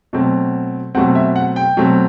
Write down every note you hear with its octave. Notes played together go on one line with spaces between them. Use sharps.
B2 F#3 A3 C4
B2 F#3 A3 C4 F#5
E5
F#5
G5
B2 F#3 A3 C4